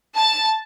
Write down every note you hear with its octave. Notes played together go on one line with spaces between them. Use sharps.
A5